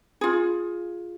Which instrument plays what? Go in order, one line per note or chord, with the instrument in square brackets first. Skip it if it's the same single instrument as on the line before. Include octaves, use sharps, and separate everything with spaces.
[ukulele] F4 G#4